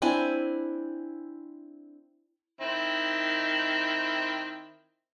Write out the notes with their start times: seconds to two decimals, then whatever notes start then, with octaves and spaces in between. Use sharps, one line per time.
0.02 C4 D4 E4 G#5
2.61 D#3 C4 E4